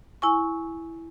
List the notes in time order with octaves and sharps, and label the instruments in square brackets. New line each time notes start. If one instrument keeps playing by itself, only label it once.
[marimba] E4 G#5 C#6